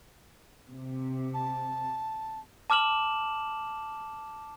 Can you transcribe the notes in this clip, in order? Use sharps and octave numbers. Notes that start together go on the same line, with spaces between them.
C3
A5
A5 D6 F6 E7 F#7